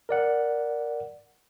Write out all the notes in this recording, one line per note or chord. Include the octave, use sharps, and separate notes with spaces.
A#4 D5 F#5